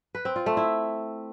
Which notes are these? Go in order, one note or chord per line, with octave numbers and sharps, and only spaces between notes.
B4
C4
F4
A3
E4